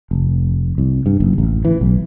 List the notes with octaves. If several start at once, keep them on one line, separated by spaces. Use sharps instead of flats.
F1
C2
G2
F#1
A1
E3
B1